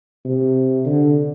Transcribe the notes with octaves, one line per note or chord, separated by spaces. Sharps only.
C3
D3